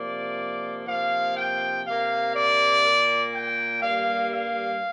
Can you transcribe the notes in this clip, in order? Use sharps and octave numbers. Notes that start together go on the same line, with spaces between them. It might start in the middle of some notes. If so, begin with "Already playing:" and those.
Already playing: C3 F3 A#3 D5
C3 F3 A#3 F5
G5
C3 A#3 F5
D5
A#2 A#3
G5
G2 G3 A#3 F5
F5